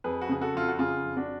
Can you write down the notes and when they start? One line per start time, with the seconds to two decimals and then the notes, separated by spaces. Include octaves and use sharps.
0.04 F2 G#4 B4
0.21 F#4
0.29 C#3 G#4
0.41 F#4 A4
0.54 F2 F4
0.68 F#4
0.79 C#3 F4 G#4
1.04 F2
1.17 D4 F#4